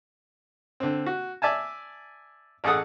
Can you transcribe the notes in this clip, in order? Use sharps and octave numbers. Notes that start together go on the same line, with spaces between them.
D3 C4
F#4
D5 E5 G#5 A5
A1 G#4 A4 F#5 D#6